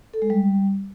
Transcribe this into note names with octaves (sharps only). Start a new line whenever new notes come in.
A4
G#3
G3